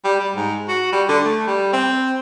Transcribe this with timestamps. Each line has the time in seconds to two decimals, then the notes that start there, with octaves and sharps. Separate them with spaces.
0.04 G3
0.20 G3
0.36 G#2
0.68 F#4
0.92 G3
1.08 D3
1.24 A3
1.47 G3
1.73 C4